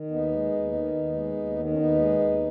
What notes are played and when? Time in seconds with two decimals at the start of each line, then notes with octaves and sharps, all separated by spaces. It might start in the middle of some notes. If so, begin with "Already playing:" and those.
Already playing: D#3
0.11 D#2 B3 D#4
0.32 G#3
0.52 D#2
0.73 D#3
0.94 D#2
1.14 G#3
1.36 D#2
1.57 D#3
1.73 C#4
1.77 D#2 B3 D#4
1.98 G#3
2.19 D#2